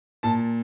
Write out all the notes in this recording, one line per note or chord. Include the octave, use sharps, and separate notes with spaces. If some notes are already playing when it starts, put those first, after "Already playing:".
A#2 A5